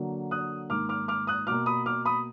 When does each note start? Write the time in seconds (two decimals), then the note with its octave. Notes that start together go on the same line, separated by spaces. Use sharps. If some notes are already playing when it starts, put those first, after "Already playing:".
Already playing: D3 F#3 A#3
0.31 D#6 F#6
0.70 G#2 D#3 A#3 D6 F6
0.89 D6 F6
1.08 D6 F6
1.27 D#6 F#6
1.47 B2 A#3 D6 F6
1.66 B5 D#6
1.86 D6 F6
2.05 B5 D#6